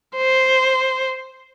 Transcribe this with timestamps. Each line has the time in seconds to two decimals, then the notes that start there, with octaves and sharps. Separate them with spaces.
0.16 C5